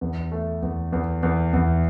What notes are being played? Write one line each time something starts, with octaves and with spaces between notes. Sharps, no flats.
E2
A3
E2
E2
E2
E2